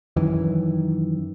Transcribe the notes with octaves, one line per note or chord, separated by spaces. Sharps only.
F#2 D#3 E3